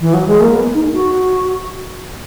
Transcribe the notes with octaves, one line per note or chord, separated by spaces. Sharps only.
E3
F#3
G#3
A#3
B3
D#4
F#4